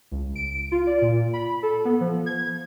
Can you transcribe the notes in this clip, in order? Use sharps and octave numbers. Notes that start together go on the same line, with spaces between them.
C#2
D7
F4
D5
A#2
B5
A4
B3
F3
G#6